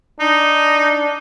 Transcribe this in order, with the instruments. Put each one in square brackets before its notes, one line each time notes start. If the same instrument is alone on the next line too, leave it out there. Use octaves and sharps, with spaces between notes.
[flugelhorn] D4 [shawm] D#4